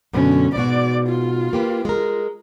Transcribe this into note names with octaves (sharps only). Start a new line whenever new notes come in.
F#2 B2 D3 C#4
G#2 B2 F#4 D5
F4
A#3 G4 B4
G#3 A#4